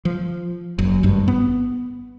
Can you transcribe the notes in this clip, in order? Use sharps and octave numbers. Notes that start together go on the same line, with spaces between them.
F3
F#1 F#2
G#1 G2
B3